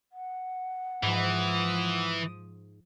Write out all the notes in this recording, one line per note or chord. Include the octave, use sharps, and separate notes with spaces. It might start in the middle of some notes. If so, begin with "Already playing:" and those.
F#5
G#2 E3 F3 D#6